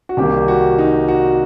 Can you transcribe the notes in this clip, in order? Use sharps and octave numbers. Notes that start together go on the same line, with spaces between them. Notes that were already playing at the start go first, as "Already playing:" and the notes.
F#4
C2 C3 D#3 G3 A#3 G4
F#4
D#4
F#4